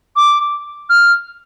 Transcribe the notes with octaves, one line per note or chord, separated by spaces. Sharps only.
D6
F6